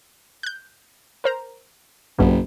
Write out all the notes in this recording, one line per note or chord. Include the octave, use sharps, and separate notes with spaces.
F#6 G6
A#4 C5 A#5
F#1 B1 G2 B2